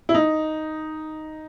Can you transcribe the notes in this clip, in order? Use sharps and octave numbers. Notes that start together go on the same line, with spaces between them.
E4
D#4